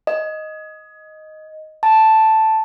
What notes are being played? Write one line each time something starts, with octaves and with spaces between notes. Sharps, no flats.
D#5
A5